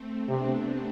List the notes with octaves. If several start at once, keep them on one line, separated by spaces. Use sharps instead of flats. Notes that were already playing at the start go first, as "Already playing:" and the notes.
Already playing: A3 C4
C3 B3 D4